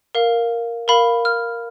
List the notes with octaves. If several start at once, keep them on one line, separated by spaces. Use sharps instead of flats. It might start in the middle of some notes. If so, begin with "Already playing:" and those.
A#4 F5
A#4 F5 B5
F6